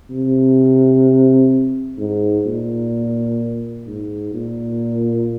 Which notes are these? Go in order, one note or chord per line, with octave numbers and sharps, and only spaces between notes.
C3
G#2
A#2
G#2
A#2